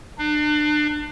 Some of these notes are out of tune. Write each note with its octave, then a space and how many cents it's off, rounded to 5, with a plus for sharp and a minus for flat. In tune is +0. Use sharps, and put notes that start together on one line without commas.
D4 +35